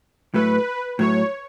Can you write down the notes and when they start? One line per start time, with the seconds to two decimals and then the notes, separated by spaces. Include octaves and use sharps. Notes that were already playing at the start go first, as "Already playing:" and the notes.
0.34 A2 F#3 A3 B4
0.99 A2 F#3 A3 C#5